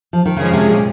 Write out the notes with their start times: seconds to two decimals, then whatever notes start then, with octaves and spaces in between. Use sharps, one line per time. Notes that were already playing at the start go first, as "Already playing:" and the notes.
0.13 F3
0.26 D#3
0.37 C#3 F3 G#3 C#4 G#4
0.53 C3
0.70 A#2